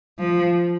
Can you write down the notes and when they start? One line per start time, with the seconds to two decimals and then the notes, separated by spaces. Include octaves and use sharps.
0.19 F3